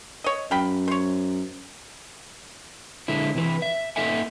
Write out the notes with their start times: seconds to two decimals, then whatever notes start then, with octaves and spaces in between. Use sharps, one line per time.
0.24 C#5 D#5
0.51 F#2 F5 G5 B5
0.88 C5 C#5
3.08 D3 G#3 E4
3.35 C3 E3 B4
3.62 E5
3.96 A#3 D#4 A4 E5 F#5 G#5